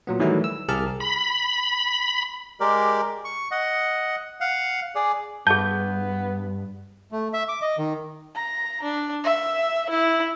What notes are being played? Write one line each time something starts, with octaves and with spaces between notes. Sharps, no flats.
A#2 F#3 B3
D#3 E3 F#3 G3 A3 E4
E6
C2 G4 G#4 A#4 A5 F6
B5
G#3 G4 A#4 D5
C#6
D#5 F#5
F5 F#5
G#4 D5
G2 B3 G#4 A5 G6
A3
E5
D6
D#5
D#3
A#5
D4
E5
E4